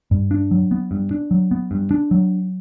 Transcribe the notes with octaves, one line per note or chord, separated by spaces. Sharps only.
G2
D4
F#3
B3
G2
D4
F#3
B3
G2
D4
F#3